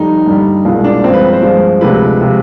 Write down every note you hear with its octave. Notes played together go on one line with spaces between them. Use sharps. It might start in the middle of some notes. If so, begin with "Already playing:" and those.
Already playing: F2 D#3 G3 D#4
G2 D3 G3
C2 B2 G#3 F4
D4
G2 F3 G#3 C4
B4
B4
C5
G2 F3 G#3
D2 C3 F3 G#3 B4
C3 F3 G#3